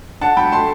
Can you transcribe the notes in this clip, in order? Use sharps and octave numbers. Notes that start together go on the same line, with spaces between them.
D4 F#5 A5
F#3 G5 B5
A3 A5 C6